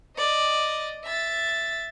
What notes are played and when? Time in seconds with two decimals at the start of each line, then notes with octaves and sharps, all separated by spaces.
0.17 D5 D#5
1.04 E5 A6